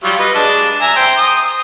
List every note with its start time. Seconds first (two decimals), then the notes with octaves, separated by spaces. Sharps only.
0.04 F#3 G3 F4
0.19 B4 D#5
0.35 G#3 D4 A5
0.81 E5 G#5 A#5
0.96 C5 G5
1.17 D#6